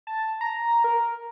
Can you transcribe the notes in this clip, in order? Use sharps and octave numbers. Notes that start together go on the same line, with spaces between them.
A5
A#5
A#4